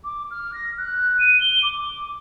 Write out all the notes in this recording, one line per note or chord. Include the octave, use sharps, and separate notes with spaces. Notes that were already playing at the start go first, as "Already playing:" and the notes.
D6
F6
A#6
F#6
D#7
G7
D6